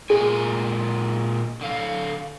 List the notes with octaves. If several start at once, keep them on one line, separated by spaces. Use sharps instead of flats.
A#2 G#3 G#4 G#5
D3 F5